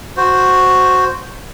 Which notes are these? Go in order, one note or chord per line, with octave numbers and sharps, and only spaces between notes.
F#4 C5